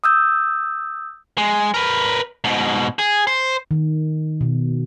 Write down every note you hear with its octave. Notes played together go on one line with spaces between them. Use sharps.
D#6 E6 G6
G#3
A#4 B4
G#2 B2
G#4
C5
D#3
B2